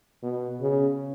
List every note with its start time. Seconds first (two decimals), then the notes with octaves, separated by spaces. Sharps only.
0.23 B2
0.61 C#3